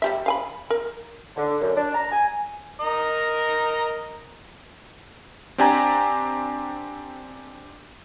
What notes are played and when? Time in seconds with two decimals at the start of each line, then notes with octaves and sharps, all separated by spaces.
0.02 G3 G4 E5
0.26 F5 G#5 B5
0.70 A#4
1.37 D3
1.60 F#2
1.76 D4
1.94 A#5
2.12 G#5
2.80 A#4 D#5 A#5
5.58 C4 D4 G4 D5 G#5 A#5